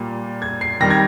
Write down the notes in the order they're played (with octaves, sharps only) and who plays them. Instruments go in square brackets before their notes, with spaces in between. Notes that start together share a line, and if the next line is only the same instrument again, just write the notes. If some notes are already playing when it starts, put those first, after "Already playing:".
Already playing: [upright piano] A#2 G3 A#3
G#6
C7
D#3 G3 C4 A#6
G#6